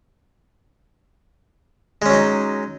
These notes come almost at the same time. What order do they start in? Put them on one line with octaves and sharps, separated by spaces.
G#3 C#4 F#3 D#4